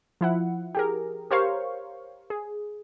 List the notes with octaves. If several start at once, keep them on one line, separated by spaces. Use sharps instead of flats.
F3 E4 F#5
G4 G#4 A#4
G4 A#4 C5 C#5 F5 C#6
G#4